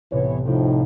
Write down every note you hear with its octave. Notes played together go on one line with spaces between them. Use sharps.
C2 A2 C3 E3 B3 C#5
A2 C3 F3 D#4 G5